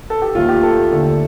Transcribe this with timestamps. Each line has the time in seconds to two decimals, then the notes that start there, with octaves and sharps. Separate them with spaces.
0.10 A4
0.22 G4
0.35 D#2 D#3 A3 F4
0.49 G4
0.63 A4
0.91 D#2 D3 A3